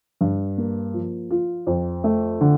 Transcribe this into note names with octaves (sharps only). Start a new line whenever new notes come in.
G2
A#3
F3
F4
F2
A3
D3